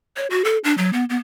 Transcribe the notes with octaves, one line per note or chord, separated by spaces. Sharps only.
C#5
F#4
A4
D4
F#3
B3
B3